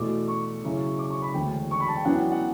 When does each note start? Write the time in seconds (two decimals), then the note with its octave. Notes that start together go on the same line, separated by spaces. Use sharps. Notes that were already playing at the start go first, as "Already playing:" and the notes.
Already playing: E2 B2 A3 D6
0.28 C#6
0.63 F#2 C#3 F#3 C#4 E4
0.99 D6
1.10 C#6
1.22 B5
1.34 E1 D2 D3 G5
1.71 C#6
1.80 B5
1.88 A5
1.97 G5
2.05 F#2 E3 B3 D4 F#5
2.14 G5
2.32 F#5